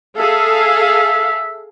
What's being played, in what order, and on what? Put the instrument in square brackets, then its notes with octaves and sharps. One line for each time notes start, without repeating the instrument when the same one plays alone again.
[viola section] G#4 A4 F5 [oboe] E5